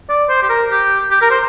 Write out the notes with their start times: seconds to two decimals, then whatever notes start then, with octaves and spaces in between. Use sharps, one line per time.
0.09 D5
0.29 C5
0.43 G4
0.49 A#4
0.70 G4
1.10 G4
1.21 A#4
1.31 C5